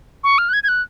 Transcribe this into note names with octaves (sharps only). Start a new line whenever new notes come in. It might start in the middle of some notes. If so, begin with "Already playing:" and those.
C#6
F6
F#6
G#6
G#6
F#6